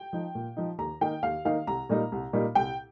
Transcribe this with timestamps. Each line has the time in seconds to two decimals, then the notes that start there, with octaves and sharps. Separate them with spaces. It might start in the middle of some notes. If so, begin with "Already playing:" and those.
Already playing: G5
0.13 F3 D#4
0.35 A#2
0.57 F3 D#4
0.78 D#2 A#5
1.01 D#3 A#3 D#4 G5
1.23 D#2 F5
1.45 D#3 A#3 D#4 F5
1.67 C2 A#5
1.89 A#2 G3 A#3 D#4
2.12 C2
2.33 A#2 G3 A#3 D#4
2.55 C2 G5